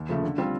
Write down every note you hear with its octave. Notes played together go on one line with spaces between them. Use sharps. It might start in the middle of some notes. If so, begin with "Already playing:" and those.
Already playing: D#2
C#3 F3 A3
D3
G3 C4 F4